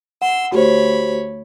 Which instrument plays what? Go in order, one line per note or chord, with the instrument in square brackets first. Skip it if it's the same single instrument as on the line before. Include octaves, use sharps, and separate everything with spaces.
[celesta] F#5 [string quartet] C6 E6
[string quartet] D2 C#5 B5 [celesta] F#4 G4 C5